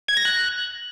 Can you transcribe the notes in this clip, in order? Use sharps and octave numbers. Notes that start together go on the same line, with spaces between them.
G#6
A#6
F#6